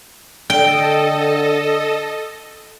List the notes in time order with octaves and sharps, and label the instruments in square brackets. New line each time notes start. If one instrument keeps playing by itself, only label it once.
[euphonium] D3 [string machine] A4 D#5 [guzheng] G5